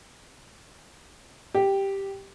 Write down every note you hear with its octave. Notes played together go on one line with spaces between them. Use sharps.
G4